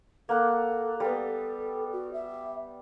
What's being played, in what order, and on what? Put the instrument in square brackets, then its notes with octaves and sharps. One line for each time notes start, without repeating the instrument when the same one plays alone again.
[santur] A#3 F#5 [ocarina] A4
[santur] G3 B3 [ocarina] A4
[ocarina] F#4
E5